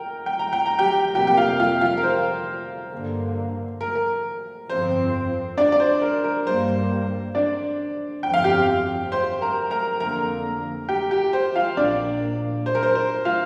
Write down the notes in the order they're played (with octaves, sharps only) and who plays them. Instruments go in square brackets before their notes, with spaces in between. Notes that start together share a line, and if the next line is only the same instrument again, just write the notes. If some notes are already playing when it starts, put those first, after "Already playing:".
Already playing: [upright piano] A#4 G5 A#5
G5
A#5
G5
A#5
G4 G5
[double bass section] F1 F2 C3 G3 A#3 [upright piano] G4 G5
[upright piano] G5
F4 F5
F4 F5
F4 F5
A#4
C5
[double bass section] G2 D3 A#3
[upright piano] A#4
A#4
[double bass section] G1 F2 F3 C4 [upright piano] C5
[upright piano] D4 D5
D5
C5
A#4
A#4
[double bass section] G2 G3 A#3 [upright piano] C5
[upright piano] D4 D5
[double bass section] G1 F2 F3 C4 [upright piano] G5
[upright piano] F5
G4 G5
C5 C6
A#4 A#5
A#4 A#5
[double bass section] F2 D3 A#3 [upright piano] A#4 A#5
[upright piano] G4 G5
G4 G5
C5
F4 F5
[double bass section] A#1 A#2 A#3 [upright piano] D4 D5
[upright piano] C5
A#4
C5
C5
F4 F5